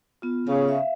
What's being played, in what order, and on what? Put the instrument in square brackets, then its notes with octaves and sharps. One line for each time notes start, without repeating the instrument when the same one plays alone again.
[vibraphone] B3 F4
[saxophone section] C#3
[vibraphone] E5 F5